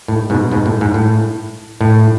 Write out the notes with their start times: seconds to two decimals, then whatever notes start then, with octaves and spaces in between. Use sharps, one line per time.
0.08 A2
0.30 G#2 B2
0.51 G#2 B2
0.66 A2
0.81 G#2
0.94 A2
1.81 A2